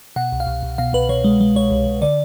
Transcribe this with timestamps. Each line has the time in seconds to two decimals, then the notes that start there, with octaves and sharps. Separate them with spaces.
0.16 B2 F#5
0.32 C2
0.40 F5
0.47 C2
0.63 C2
0.78 B2 F5
0.93 C2 B4
1.09 B2 C#5
1.24 G#3
1.41 G#3
1.55 C2 C#5
1.71 C2
1.86 C2
2.02 D3 D5